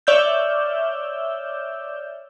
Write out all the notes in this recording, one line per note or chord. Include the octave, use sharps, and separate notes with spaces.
C#5 D5 E5 E6 F6 G6